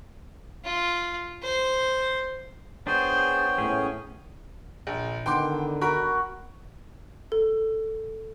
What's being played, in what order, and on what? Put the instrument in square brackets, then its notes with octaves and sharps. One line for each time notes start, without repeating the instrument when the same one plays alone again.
[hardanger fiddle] F4
C5
[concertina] B3 C#5 G5 [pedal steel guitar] D4 G#4 [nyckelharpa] C5
[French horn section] A2 [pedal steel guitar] C#4 G#4
[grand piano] A#1
[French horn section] D3 D#3 [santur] B3 [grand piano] G5 C6 D6
[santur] F#4 [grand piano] A#4 B5
[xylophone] A4